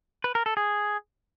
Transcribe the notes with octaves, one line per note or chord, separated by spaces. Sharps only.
B4
A#4
A4
G#4